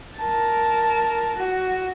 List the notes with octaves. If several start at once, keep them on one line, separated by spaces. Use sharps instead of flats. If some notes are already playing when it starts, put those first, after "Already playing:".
A#4 A5
F#4